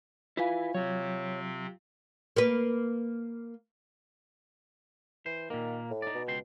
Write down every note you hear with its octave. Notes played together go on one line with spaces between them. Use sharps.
E4 F4 B4 F5 G#5
C3 F#3 C4 C#5
A#3 B4
E3 C5
A#2 D#3 A#3
A2
D#4 D5
B2
C#2 G5 C6